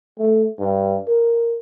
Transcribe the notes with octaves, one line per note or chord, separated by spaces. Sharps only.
A3
G2
A#4